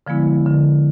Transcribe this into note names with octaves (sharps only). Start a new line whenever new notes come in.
D3 F3 G#3 B3 E4
D3